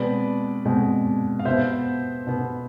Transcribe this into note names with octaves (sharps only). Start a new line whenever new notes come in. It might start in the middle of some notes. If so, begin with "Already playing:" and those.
Already playing: B2 G#3 C4 B4 D5
B2 G#3 C4
F5
B2 C5 E5
B3
B2 B3